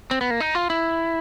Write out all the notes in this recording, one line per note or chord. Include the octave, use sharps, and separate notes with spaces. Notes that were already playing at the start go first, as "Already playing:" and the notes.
C4
B3
A#3
D#4
F4
E4